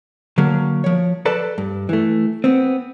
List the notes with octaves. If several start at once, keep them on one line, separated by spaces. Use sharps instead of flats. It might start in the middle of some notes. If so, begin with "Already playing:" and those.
D3 F#3 A#3
F3 C#5
A4 B4 D5 A5
G2
E3 A3
B3 C4